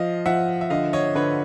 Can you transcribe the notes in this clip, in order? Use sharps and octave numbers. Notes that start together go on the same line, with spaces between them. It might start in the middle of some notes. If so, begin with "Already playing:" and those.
Already playing: F3 D#5 F5
F3 E5 F#5
E5
D3 D#5 F5
C#5 D#5
D3 B4 C#5